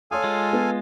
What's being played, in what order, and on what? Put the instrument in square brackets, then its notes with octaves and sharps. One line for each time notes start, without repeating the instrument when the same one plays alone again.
[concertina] A4 F5 G#5 [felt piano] C#5 C6 D#6
[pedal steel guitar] G#3 F4
[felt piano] B3